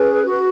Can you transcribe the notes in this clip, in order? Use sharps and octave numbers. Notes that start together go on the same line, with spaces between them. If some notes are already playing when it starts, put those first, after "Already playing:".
Already playing: C#4 G#4 B4
F#4 B4